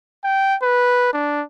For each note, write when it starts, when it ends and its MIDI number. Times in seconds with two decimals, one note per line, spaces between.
0.24 0.56 79
0.63 1.11 71
1.13 1.43 62